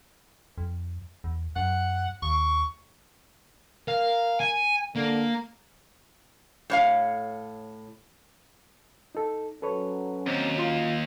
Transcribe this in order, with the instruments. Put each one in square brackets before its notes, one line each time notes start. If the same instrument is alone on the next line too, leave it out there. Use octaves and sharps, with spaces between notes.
[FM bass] F2
E2
[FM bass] F#2 [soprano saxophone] F#5
[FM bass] D#2 [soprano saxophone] C#6
[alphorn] A#4 [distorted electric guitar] F5
[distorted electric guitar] G#5
[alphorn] D3 [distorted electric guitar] A#3
[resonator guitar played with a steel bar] A2 C#5 F5
[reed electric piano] D#4 A4
[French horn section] F#3 C#4 [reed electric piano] A4 B4 C#5
[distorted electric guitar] D#2 [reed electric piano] C4
[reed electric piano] F4 F5 C6